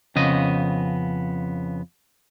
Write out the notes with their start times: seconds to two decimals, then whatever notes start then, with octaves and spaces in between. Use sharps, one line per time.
0.16 F2 C#3 B3 D#5